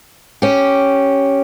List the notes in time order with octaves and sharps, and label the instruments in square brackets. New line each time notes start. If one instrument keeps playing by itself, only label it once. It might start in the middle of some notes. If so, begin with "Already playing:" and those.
[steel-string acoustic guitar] C#4 G4